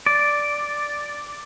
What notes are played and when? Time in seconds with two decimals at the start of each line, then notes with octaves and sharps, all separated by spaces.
0.06 D5